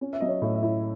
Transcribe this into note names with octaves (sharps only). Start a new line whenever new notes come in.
C#4
E5
F#3 D#5
C#5
A2
E5
E4